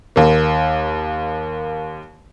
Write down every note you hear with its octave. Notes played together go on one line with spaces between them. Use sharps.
D#2 A#3